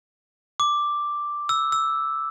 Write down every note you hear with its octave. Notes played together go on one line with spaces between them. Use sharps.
D6
E6
E6